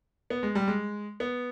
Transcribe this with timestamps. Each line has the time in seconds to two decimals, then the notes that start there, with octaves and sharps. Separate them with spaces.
0.30 B3
0.43 G#3
0.55 G3
0.68 G#3
1.20 B3